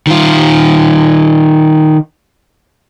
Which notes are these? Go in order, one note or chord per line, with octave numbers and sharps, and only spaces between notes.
D#3 F4